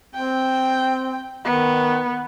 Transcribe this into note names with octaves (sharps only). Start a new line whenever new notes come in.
C4 G5
D#3 B3